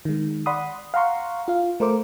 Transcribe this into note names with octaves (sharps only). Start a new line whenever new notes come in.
D#3 G#3
D5 F#5 B5 C6 D#6
F5 F#5 A#5 C6 C#6
F4 F5
A3 A#4 C5 D6